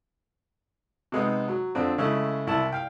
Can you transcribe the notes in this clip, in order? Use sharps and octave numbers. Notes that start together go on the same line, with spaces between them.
C3 G#3 B3 D#4
F#3
F2 D3 C4 D4
C#3 G#3 A3 E4
C2 E4 A5
F5 G5